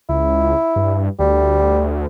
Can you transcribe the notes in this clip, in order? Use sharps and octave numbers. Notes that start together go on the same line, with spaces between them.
C#2 E4
G2
D2 G3